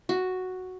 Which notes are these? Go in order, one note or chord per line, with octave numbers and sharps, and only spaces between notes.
F#4